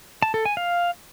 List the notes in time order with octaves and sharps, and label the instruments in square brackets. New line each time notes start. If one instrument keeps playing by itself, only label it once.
[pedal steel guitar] A5
A4
G#5
F5